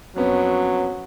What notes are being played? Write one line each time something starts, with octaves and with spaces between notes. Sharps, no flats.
F2 F#3 B3 C#4